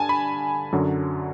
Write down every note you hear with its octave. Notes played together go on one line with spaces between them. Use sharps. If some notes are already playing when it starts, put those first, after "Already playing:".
Already playing: G2 D3 G#5 A5
B5
F#2 D3 F#3